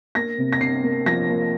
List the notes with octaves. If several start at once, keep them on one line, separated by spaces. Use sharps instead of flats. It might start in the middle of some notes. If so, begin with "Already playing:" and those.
A#3 A#6
C3
A#6
C3 C7
A#3
F3 A#6
A#3